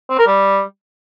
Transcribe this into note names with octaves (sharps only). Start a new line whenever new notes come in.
C4
A#4
G3